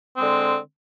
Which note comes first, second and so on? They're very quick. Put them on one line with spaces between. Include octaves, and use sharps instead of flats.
C4 G#3 D3